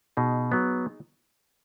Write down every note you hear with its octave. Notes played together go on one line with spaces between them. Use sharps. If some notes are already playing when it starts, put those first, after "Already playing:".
B2 D#4 G#4
F#3 B3